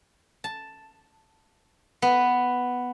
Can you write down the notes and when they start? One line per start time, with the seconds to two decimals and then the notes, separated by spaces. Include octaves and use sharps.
0.44 A5
2.02 B3